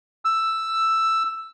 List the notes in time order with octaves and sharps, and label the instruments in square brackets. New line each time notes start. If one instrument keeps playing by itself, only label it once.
[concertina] E6